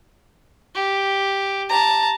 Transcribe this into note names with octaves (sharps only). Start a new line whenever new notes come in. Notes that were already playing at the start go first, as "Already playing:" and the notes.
G4
A5 A#5